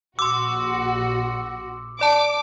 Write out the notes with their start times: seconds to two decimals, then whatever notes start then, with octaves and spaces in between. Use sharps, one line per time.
0.19 A#1 F#4 C6 D6 E6
2.01 D5 A5 D6